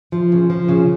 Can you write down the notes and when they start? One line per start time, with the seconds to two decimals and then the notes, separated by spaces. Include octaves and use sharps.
0.12 F3
0.32 C#3
0.50 F3
0.69 C#3